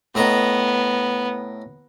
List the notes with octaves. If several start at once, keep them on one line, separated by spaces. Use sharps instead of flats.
A2 B3 D#5 A#5